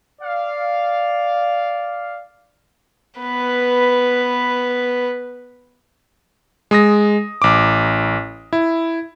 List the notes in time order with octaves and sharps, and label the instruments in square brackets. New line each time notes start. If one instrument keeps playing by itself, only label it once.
[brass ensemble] D5 F5
[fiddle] B3 B4
[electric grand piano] G#3 D#6 A#6
A1 D6
E4